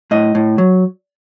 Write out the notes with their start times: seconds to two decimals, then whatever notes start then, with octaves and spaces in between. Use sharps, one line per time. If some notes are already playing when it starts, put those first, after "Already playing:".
0.11 A2 D#5
0.35 A2
0.58 F#3